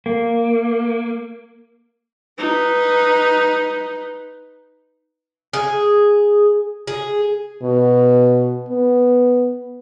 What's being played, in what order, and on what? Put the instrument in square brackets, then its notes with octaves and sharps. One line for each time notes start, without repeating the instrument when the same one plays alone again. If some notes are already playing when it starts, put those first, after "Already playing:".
[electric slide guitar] A#3
[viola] D#4 B4
[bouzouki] G#4
G#4
[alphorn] B2
B3